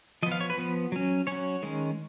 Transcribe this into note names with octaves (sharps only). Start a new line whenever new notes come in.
F3 B3 D#5
F5
C#5
B4
F3 B3
F#3 C#4
F#3 C#4 C#5
D#3 G#3 C#4